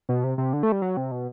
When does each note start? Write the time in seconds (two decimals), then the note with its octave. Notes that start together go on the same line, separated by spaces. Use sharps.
0.09 B2
0.24 C3
0.38 C3
0.53 D3
0.63 A3
0.72 G3
0.82 F#3
0.97 C3
1.12 B2